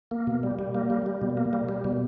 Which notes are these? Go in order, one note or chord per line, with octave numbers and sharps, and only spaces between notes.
A#3
B2
G3
G3
A#3
G3
G3
B2
A#3
G3
G3
B2